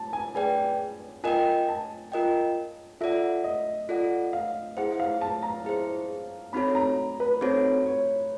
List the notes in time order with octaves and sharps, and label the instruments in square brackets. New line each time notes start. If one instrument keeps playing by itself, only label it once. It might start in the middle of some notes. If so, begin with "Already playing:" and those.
Already playing: [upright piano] A5
G#5
[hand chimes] G#4 B4 D5 G5 [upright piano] G#5
[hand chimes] F4 A#4 D#5 G5 [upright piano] G#5
[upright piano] A5
[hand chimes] F4 A#4 D#5 G5
[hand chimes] F4 A4 D5 F#5 [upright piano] E5
[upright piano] D#5
[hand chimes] F4 A4 D5 F#5
[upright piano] F5
[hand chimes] E4 G#4 C5 [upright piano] F#5
[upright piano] F5
A5
A#5
[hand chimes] E4 G#4 C5
[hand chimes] C4 D#4 F#4 A4 C#5 [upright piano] B5
[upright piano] A#5
B4
[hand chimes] C4 D#4 F#4 A4 C#5 [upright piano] C5
[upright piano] C#5